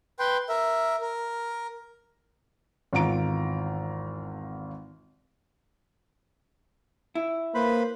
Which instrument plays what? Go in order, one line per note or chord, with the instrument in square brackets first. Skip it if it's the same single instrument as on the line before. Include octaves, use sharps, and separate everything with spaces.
[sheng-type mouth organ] B4 G5 C6
A#4 E5
A#4
[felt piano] G#1 E2 F4 A#5 D7
[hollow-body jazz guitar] E4
[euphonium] A#3 [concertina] B4 C5 B5